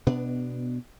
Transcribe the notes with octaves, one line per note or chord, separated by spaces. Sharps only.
B2 B3 D4